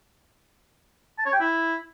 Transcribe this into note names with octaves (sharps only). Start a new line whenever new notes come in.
A5
C#5
G5
E4